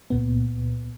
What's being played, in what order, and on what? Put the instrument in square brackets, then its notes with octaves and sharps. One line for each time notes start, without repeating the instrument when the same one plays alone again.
[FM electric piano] C#2 A#2 B3